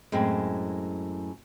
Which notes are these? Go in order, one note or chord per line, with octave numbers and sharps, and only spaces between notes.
F#2 A2 G#3 C4